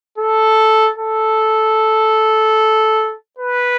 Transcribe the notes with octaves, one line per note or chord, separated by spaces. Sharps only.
A4
A4
B4